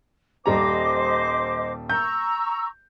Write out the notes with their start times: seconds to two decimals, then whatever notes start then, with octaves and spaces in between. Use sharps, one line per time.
0.46 D#1 G3 C5 D#5 A#5 D6
1.90 A#5 C#6 E6 G6